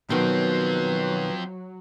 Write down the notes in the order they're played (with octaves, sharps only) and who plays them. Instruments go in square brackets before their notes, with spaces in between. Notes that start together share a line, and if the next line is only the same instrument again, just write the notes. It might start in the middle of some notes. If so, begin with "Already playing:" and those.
[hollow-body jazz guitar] B2 D#3 [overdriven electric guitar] F3 C4 [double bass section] F#3 [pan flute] B4